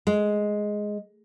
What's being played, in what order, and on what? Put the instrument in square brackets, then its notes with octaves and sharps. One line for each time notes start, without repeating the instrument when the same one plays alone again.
[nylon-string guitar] G#3